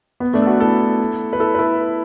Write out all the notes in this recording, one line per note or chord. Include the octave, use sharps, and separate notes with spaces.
B3
A3 D4
A4
F#4 B4
E4 A4
B4
E4 A4
B4
E4 A4